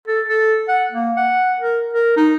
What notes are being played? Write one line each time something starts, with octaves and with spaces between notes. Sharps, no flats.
A4
A4
F#5
A#3
F#5
A#4
A#4
D#4